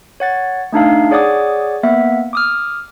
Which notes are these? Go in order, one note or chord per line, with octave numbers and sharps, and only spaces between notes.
C#5 F#5 A6
A3 D4 D#4 F5
G#4 C#5 D5 F#5 D6 D#6
A#3 B3 E5 F#5
D6 D#6 F6